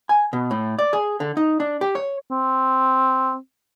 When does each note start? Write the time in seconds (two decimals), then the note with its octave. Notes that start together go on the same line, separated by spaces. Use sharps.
0.09 G#5
0.33 B2
0.51 A2
0.79 D5
0.93 G#4
1.20 D3
1.37 D#4
1.60 D4
1.81 G4
1.95 C#5
2.31 C4